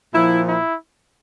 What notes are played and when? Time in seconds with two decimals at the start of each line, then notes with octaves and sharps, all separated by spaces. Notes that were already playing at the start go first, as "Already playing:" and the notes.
0.14 A#2 F3 E4
0.45 E4